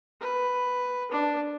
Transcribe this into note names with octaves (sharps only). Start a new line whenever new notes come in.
B4
D4